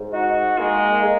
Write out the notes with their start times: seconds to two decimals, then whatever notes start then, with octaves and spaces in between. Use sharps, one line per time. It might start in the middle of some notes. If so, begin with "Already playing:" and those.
Already playing: G#2
0.14 D#4 F#4
0.58 G#3 A#3
1.04 G#4